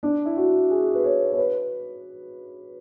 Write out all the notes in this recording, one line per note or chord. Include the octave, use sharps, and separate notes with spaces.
D4
E4
F#4
G#4
B4
C#5
C#5
B4